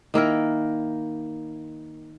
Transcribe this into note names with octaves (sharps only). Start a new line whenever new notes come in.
D#3 A#3 E4 A#4